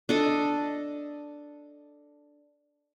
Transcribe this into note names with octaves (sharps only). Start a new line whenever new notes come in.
D4 A4 D#5